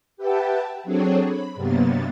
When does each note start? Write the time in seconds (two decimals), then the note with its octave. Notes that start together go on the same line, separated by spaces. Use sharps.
0.17 G4 B4 E5 F#5 G5 A5
0.84 F#3 C4 D4 G#4 A4 C#5
1.26 B5
1.55 G2 C3 F#3 A#3 B3 A6